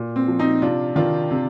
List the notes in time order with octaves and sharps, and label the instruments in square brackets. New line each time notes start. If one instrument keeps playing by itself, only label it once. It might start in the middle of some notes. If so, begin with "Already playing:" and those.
Already playing: [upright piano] A#2
C4
F3
C4 D#4
C3 D4 F4
D#3 D4 F4
C3